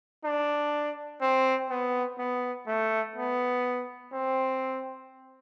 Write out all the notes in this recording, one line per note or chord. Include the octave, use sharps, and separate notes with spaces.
D4
C4
B3
B3
A3
B3
C4